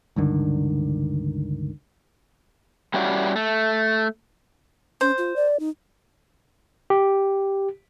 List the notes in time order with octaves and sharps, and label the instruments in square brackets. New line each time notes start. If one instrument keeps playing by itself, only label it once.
[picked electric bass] C#2 G2 D3 D#3
[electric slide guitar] G3 C#4 E4 F#4 D5
A3
[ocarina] C#4 [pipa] C5
[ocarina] F4
D5
D#4
[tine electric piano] G4